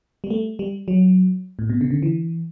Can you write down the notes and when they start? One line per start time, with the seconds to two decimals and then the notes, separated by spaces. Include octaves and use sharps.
0.24 G3
0.30 A3
0.59 G3
0.88 F#3
1.59 A2
1.70 B2
1.81 C#3
1.91 D3
2.03 E3